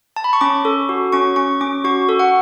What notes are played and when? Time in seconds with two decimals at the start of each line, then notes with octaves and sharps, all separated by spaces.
0.16 A5
0.24 B5
0.33 C#6
0.41 C#4 D6
0.65 A4
0.89 F#4
1.12 C#4 C#6
1.36 C#4 C#6
1.61 C#4 D6
1.84 F#4 C#6
2.09 A4
2.19 F#5